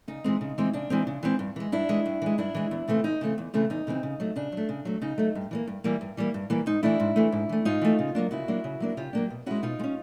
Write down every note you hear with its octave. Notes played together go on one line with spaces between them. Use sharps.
C#3 D#4
E3 G#3 C4
C#3
E3 G#3 C4
C#3 D4
E3 G#3 C4
C#3
E3 G#3 C4
G2
E3 G#3
G2 D4 E4
E3 G#3
G2
E3 G#3
G2 D4 E4
E3 G#3
E2
C#3 E3 A3 C4
E2 D#4
C#3 E3 A3 C4
E2
C#3 E3 A3 C4
E2 D#4
C#3 E3 A3 C4
C#3
F#3 A3
C#3 D4
F#3 A3
C#3
F#3 A3
C#3 D#4
F#3 A3
G2
E3 G3 A#3
G2
E3 G3 A#3
G2
E3 G3 A#3
G2
E3 G3 A#3
G#2 D#4
E3 A3 D4 E4
G#2
E3 A3
G#2
E3 A3
G#2 D#4 F4
E3 A3
C#3
F#3 A#3 D4
C#3 E4 F#4
F#3 A#3 D4
C#3
F#3 A#3 D4
C#3 F4 G4
F#3 A#3 D4
B2
G#3 C#4 E4 F#4
B2 D#4 F4
G#3
C#4